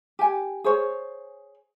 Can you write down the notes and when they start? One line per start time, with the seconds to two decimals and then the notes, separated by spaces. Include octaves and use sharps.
0.19 G4 G#5
0.64 G#4 C5 C#5